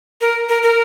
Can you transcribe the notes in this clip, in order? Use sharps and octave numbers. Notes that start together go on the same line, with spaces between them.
A#4
A#4
A#4